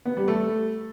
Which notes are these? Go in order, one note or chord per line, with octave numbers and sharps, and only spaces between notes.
B3
G3
A3